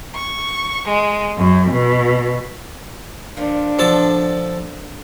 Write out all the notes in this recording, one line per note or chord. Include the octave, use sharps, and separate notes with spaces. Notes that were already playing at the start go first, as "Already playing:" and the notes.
C#6
G#3
F#2
B2
A#2 F3 D4
D3 F3 A4 A5